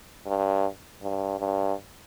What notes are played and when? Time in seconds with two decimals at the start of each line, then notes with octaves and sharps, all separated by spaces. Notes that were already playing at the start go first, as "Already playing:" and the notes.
0.26 G2
1.02 G2
1.40 G2